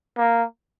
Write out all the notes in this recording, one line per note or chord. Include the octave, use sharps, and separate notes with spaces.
A#3